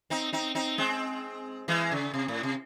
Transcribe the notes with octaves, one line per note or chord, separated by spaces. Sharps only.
C4 D#4
C4 D#4
C4 D#4
G#3 C4
E3 G#3
C#3
C3
A2
C3